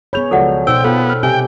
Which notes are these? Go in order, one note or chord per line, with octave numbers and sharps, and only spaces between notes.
B3 G#4 C#5 B5 G6 F7
C#2 F3 F#3 A4 D5 F#5
B2 D#4 C5 G5 E6
B3 F4 A4 B4 F#5 G5
F6
C3 G4 G5 G#5